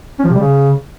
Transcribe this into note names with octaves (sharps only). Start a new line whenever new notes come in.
C#4
F3
C3
G3
C#3